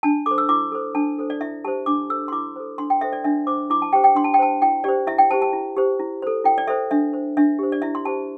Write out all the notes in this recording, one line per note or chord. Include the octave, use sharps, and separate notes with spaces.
D4 A5
A4 C5 D6
E6
E4 D6
A4 C5
D4 A5
A4 C5
D5
E4 E5
G4 C5 A5
D4 D6
A4 C5 E6
C6
E4 D6
A4 C5
D4 C6
G5
A4 C5 E5
D5
D4 E5
C5 D6
E4 D6
A5
G4 C5 G5
G5
D4 C6
A5
G5
C5 A5
E4 G5
G4 C5 D5
E4 E5
G5
G4 C5 A5
A5
E4
G4 C5
E4
A4 C5
E4 G5
D5
A4 C5 E5
D4 E5
C5
D4 E5
G4 C5
D5
E4 E5
C6
G4 C5 A5